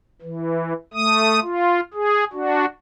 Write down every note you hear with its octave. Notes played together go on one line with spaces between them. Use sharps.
E3
A3 D#6
F4
G#4
D4 F#4